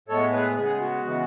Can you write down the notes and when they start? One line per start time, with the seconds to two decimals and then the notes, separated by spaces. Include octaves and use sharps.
0.08 A2 G#3 B3 A4 C#5
0.32 G#4 B4
0.56 C#3 G#3 B3 G#4
0.80 F#4
1.04 C#3 E3 G#3 B3